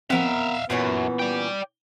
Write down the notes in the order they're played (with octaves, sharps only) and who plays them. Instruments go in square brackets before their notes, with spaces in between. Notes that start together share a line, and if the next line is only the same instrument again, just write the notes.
[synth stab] F3 C4 [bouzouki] B3 A#4 A#5 [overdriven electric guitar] E5 F5
[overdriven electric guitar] F#2 [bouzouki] A#2 E3 C#4 [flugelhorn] B3
[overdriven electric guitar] D5 G5